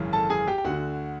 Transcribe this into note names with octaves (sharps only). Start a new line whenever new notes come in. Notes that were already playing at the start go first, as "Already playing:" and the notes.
Already playing: G#1 F#2 C#3 E3
A4 A5
G#4 G#5
G4 G5
G5
D2 D3 F#4 F#5